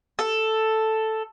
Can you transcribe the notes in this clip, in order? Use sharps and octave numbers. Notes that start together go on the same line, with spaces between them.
A4